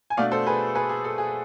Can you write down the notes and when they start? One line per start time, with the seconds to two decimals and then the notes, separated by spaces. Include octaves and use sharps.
0.10 G#5
0.17 B2 A3 D4 D5 F5
0.32 A4 C5
0.46 G#4 B4
0.75 G#4 B4
0.89 G#4
1.04 A4
1.18 G#4